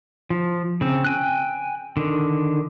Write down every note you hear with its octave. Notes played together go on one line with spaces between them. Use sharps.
F3
C#3 C4
G5 G#5 F#6
D3 D#3